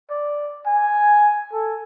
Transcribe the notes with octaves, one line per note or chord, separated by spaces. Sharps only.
D5
G#5
A4